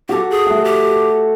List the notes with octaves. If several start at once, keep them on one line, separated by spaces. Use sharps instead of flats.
F#4 G4 A4
G#4
A3 F#5
G4